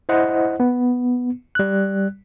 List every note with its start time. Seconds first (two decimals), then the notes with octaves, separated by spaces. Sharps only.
0.09 E4 C5 D#5 F#5
0.60 B3
1.55 G3 F#6